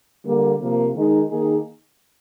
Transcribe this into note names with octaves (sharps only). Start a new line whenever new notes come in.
D3 G3 A#3
C3 F3 A#3
D#3 G#3 D#4
D#3 A#3 D#4 G#4